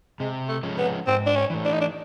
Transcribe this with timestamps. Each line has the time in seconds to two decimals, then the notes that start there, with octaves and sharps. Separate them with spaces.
0.20 C3 G#3
0.49 A3
0.63 F3 G#3 C#4
0.78 B3
1.07 G#2 C4
1.26 D4
1.36 C#4
1.50 E3 A3
1.65 D4
1.73 D#4
1.80 D4